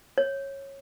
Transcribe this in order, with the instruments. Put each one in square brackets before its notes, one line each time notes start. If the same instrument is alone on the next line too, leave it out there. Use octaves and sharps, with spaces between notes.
[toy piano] C#5